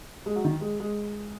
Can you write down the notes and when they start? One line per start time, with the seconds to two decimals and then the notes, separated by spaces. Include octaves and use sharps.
0.26 G#3
0.36 F#3
0.45 D#3
0.61 G#3
0.80 G#3